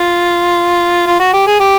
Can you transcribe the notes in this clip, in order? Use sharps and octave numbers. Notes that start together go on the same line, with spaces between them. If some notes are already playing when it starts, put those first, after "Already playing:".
Already playing: F4
F4
F#4
G4
G#4
G4